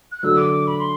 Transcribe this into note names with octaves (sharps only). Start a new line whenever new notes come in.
F#6
D3 F#3 A3 D4 F#4 E6
D6
B5
C6